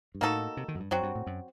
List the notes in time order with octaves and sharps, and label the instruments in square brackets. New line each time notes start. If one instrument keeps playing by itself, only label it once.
[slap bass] G2
[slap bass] A2 [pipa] A#3 D#4 F#4 A4
[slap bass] C3
D#3
F#2
G2
[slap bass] F#2 [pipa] F#3 C4 F#4
[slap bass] G2
A2
F#2